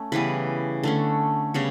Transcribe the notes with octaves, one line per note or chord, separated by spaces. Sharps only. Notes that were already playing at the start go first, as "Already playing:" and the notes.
Already playing: A3 C#4
C#3 E3 G3 B3 B4
D3 A3 C#4
C#3 G3 B3 C#5